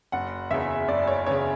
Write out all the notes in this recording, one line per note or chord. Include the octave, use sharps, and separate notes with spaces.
F#1 F#5
E2 C#3 E5
F#1 D5
C#5
E2 C#3 C#5